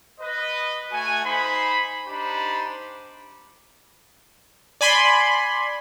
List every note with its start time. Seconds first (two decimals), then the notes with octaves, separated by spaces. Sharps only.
0.20 B4 D#5
0.91 A3 F#4 G#5
1.24 D#4 C5 G#5 B5
2.06 D4 D#4 G4 C5 B5
4.81 D5 G#5 B5 C6